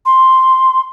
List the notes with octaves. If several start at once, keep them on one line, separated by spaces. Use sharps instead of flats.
C6